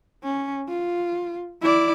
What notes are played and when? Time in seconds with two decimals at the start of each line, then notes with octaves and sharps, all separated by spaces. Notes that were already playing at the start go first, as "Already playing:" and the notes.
0.24 C#4
0.68 F4
1.62 E4 D5